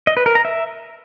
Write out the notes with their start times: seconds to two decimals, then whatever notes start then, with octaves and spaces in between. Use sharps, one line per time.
0.07 D#5
0.17 B4
0.26 A#4
0.35 A#5
0.45 E5